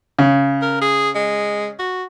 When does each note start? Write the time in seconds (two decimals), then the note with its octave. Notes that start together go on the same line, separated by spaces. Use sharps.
0.19 C#3
0.62 A#4
0.81 G#4
1.15 G#3
1.79 F#4